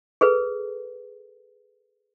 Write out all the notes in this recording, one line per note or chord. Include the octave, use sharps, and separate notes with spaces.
G#4 A4 B4